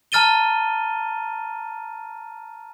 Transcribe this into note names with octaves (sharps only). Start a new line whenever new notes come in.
A5 A#5 F6 A6 D#7 G7